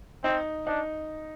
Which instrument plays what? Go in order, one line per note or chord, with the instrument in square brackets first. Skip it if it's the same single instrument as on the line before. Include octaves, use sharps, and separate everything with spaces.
[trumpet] C4 [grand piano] D#4
[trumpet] D4 [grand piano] D#4